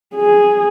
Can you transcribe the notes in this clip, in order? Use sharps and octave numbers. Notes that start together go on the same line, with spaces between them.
G#4